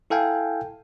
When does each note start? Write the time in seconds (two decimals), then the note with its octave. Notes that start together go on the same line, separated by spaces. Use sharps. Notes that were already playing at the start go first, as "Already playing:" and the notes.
0.10 E4 A4 F5 G5 G#5